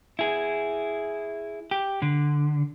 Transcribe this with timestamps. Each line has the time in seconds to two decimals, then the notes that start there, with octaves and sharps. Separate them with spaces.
0.19 E4 G#4
1.71 G4
2.02 D3